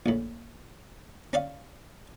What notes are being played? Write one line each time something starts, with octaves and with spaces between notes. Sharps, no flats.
A#1 A2
C#4 D5 F5